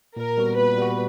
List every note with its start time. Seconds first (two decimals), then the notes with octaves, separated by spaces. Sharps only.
0.16 A#2 A#4
0.37 G3 B3 F#4
0.57 A#2 B4
0.78 G3 B3 F#4